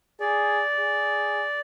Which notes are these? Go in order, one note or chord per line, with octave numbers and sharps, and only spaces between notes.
G#4 D5
G#4